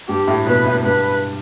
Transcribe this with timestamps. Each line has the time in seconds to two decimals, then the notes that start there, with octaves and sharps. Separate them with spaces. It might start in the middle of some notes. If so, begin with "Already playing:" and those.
0.08 G2 G4
0.28 A2
0.46 B2 B4
0.65 A2
0.84 G2 B4